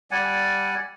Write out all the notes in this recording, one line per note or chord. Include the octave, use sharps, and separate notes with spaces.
G3 D5 F#5 G#5